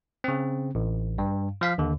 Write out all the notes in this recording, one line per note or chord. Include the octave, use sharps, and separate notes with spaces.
C#3 C4
A1
G2
F3 F5 B6
D#2 D3